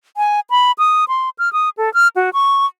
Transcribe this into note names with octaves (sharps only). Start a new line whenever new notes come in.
G#5
B5
D#6
C6
F6
D#6
A4
F6
F#4
C#6